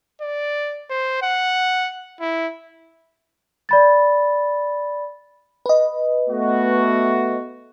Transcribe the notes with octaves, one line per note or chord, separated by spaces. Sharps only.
D5
C5
F#5
E4
D5 B5 A6
B4 D#5
A3 B3 F#4